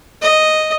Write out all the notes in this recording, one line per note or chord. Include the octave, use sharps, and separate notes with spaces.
D#5